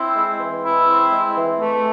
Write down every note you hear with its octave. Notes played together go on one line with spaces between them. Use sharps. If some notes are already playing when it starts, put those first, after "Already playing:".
Already playing: C4 E4
G#3
E3
E4
C4
G#3
E3
A3